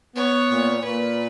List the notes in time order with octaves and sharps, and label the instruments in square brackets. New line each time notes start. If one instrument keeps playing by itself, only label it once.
[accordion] B3 [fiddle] C#5
[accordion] A#2
[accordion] A#2 [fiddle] B4